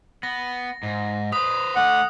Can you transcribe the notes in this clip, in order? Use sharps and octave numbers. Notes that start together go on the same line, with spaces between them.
B3 A#6
G#2
B4 C5 D#6
D3 A3 F#5